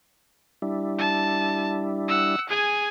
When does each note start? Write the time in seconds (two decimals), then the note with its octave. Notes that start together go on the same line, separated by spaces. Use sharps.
0.62 G3 D4 E4
0.99 A5
2.08 F#5 E6
2.49 G#4 G#5